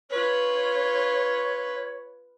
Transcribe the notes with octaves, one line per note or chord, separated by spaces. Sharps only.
F4 B4 C#5